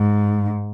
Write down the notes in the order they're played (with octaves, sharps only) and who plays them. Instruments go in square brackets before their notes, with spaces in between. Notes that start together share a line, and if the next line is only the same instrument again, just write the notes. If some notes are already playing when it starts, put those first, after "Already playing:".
Already playing: [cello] G#2